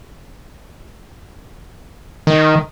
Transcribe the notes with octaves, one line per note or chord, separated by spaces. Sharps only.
D#3